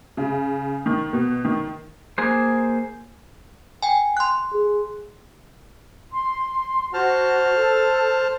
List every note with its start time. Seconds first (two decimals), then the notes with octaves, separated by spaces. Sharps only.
0.17 C#3
0.86 D#3
1.13 B2
1.45 D#3
2.18 A#3 G#4 C5
3.83 G5 G#5
4.17 C6 F#6
4.53 G#4
6.12 C6
6.94 F#4 C5 A5 F6
7.55 A4